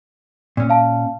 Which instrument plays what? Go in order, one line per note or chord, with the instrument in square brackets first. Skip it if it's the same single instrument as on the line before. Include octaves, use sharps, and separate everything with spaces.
[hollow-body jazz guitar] A#2 C#4
[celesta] F5 A5